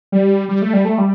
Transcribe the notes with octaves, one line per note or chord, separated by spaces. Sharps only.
G3
G3
A3
G3
A3
G3